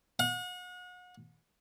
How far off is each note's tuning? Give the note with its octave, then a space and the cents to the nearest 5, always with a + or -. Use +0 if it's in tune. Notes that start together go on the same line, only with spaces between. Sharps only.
F#5 -40